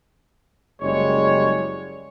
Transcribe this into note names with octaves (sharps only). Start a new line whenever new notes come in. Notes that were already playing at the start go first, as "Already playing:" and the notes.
F#1 G3 G#3 C#5